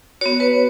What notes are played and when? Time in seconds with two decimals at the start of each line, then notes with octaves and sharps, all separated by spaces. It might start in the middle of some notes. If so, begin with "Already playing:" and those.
0.21 B3 F#4 C#5
0.40 B4